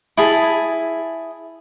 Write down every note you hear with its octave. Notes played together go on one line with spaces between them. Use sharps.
E4 G#4 A5